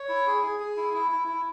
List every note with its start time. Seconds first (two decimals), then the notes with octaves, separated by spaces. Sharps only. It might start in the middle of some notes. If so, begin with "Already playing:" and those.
Already playing: C#5
0.09 E4
0.27 G#4
0.43 G#4
0.60 G#4
0.77 E4
0.93 E4
1.11 E4
1.28 E4